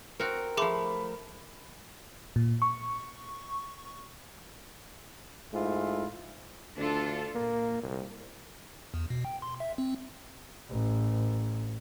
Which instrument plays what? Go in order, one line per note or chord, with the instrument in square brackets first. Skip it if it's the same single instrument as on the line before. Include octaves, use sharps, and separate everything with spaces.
[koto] C4 F#4 [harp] A#4
[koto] F3 A3 [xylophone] G#4 C6 D6 [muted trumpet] B5
[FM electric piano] A#2
C#6
[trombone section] G#2 A3 E4 F4
[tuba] D2 [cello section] D4 F4 A4
[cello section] A#2 [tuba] A#3
[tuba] C2
[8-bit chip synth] E2
B2
G5
C6
E5
C4
[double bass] A1